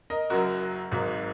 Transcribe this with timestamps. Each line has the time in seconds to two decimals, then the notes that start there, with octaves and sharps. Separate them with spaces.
0.10 A#4 D#5
0.30 F#1 F#2 F#3 F#4 A#4
0.91 G#1 G#2 F#3